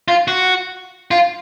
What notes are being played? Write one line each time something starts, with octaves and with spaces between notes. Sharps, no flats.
F4
F#4
F4